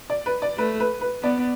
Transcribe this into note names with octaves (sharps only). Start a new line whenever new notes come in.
D5
B4
D5
A3 B4
B4
B4
B3 D5